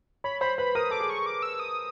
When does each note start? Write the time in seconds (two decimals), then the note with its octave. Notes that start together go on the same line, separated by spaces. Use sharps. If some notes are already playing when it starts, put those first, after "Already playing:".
0.24 C#5 B5
0.41 C5 B5
0.58 B4 B5
0.75 A#4 D#6
0.91 A4 D6
1.00 G#4
1.10 C#6
1.26 D6
1.43 E6
1.60 D#6